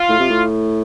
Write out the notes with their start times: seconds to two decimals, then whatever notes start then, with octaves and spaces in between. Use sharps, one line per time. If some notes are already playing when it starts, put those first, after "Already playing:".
Already playing: F4
0.09 A2
0.20 C3
0.30 A2